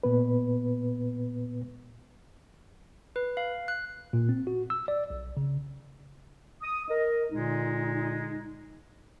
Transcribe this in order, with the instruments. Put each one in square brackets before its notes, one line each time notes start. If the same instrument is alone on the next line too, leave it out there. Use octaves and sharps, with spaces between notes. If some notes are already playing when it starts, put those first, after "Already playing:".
[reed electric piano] A#2 B3 B4
[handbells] B4
F5
F#6
[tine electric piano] A#2
C4
F#4
E6
D5
B1
C#3
[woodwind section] D#6
A#4 D#5
A#2 D3 G#3 D#4